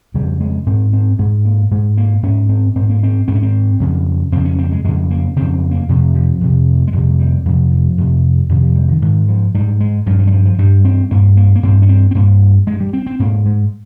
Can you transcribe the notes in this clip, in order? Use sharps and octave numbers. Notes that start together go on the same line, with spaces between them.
F2 C#3 G3
G#3
G#2 C4
C4
G#2 G#3
A#3
G#2 G#3
A#3
G#2 C#4
C4
G#2 C4
A#3
C4
G#2 C4
C#4
C4
F2 C#3
F2 C#3 C4
C#4
C4
G#3
F2 C#3 G#3
A#3
F2 C#3 C4
C4
A#3
F2 C3
F3
F2 C3
G#3
F2 C3 G3
G3
F2 C3 F3
F3
F2 C3
F2 C3 D#3
F3
G3
D#3
G#2 D#3
F3
G#2 G3
G#3
G2 F3
F3
G3
F3
F3
G2 G3
C4
G2 A#3
A#3
A#3
G2 C4
C#4
C4
C4
G2 A#3
G2 G#3
G3
C4
C4
G#2 A#3
G#3